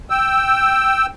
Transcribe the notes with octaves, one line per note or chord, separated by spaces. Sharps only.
G5 E6